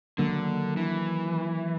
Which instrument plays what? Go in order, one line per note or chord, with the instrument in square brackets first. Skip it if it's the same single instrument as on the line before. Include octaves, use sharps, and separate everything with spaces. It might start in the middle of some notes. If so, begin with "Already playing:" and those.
[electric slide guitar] D3 [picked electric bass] D#3 F#3 A#3
[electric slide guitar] E3